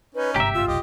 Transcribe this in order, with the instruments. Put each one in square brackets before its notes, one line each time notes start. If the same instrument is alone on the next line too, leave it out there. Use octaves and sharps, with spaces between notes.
[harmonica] C#4 D#4 [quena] B4
[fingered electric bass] G1 G#2 C3 [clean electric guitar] G4 E5 [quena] A#5
[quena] F4 [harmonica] E6
[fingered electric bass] F1 B1 [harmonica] G4 D#5